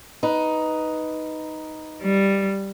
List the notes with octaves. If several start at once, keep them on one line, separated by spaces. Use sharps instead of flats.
D#4 B4
G3